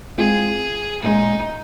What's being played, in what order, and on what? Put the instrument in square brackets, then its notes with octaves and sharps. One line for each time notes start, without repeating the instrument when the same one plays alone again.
[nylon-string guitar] G#3 C4 F4 [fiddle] G#4
[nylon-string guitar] A#2 G#3 C#4 G#4 [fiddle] D#4